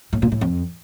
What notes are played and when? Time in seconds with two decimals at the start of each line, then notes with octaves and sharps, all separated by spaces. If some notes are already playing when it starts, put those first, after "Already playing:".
0.13 A2
0.22 A#2
0.32 A2
0.41 F2